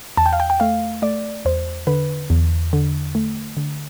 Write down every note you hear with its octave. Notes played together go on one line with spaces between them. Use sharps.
E2 A5
G5
F5
G5
G5
A3 F5
A3 D5
E2 C5
D3 B4
E2
D3
A3
D3